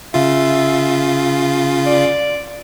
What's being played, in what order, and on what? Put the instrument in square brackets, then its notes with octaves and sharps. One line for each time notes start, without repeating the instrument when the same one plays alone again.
[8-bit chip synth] C#3 F4 [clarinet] E5
[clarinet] D5